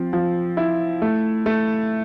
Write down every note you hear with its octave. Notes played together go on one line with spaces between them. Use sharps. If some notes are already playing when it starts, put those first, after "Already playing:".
Already playing: F3 C4
F3
E4
A3
A3